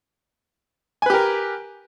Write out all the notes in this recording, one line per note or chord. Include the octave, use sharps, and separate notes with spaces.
G4 A#4 B4 G#5